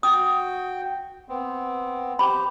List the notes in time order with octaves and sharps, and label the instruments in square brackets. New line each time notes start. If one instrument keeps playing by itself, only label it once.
[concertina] F#4 G5 [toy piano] D#6
[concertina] B3 C4
[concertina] G4 C5 [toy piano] B5